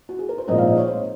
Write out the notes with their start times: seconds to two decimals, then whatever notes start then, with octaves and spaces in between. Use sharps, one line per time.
0.09 F#4
0.19 G#4
0.29 A#4
0.38 C5
0.48 A#2 F3 G#3 C4 D#4 D#5
0.58 F5
0.67 D#5
0.78 C#5
0.87 C5